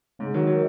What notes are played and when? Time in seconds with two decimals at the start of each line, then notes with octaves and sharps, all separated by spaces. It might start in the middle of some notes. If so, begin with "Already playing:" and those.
0.19 G#2 C#3
0.34 D#3 F#3
0.47 F#3